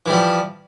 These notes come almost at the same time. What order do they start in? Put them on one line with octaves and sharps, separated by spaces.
E3 G3 F3